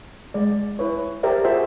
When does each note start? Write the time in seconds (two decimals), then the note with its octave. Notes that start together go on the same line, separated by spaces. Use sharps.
0.34 G#3 D5
0.79 E4 B4 C#5
1.23 G4 A#4 C5 D5 E5
1.44 F4 F#4 G#4 C5 E5